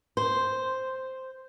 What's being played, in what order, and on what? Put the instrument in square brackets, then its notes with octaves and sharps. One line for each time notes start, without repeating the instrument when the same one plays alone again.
[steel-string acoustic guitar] C5